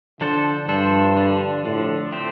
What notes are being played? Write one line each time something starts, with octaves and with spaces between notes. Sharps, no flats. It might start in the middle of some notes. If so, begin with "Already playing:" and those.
D3 F3 D4 A4 C5
G2 F3 D4 A4 C5
D3 F3 D4
A2 D3 F3 D4
A3 C4 G4 C5